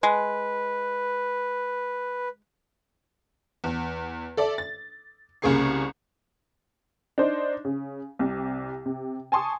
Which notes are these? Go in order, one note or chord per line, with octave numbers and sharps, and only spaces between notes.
G#3 B4
E2
A4 D5 E5
A6
C2 C#3 A#3 G#4 C#6 C7
D4 D#4 C5
C#3
C2 C3
C3
G#5 A5 C6 C#6 D#6